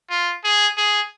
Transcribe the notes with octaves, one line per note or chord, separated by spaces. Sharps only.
F4
G#4
G#4